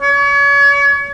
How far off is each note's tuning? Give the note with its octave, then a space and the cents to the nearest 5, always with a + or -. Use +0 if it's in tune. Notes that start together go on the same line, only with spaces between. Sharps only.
C#5 +35